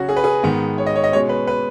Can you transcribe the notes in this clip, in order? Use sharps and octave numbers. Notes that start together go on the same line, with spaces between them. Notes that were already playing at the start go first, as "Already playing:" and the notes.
Already playing: C#3 F#3 C#4 F#4
G#4
B4
G#4
G#2 D#3 G#3 B3
C#5
D#5
C#5
D#5
B2 G#3 C#4 C#5
B4
B4